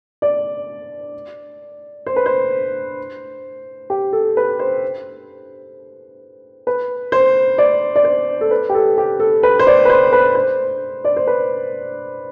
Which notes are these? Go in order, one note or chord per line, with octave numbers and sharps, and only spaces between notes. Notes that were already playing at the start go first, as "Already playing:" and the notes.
D5
C5
B4
C5
G4
A4
B4
C5
B4
C5
D5
D5
C5
A4
B4
G4
A4
G4
A4
B4
C5
D5
B4
C5
B4
C5
D5
C5
B4